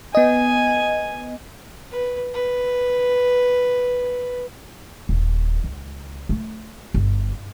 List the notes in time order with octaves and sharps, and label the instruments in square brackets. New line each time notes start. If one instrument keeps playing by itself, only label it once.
[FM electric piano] B3 D#5 [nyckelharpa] G#5
[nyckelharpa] B4
B4
[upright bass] D#1
C#2
A3
G1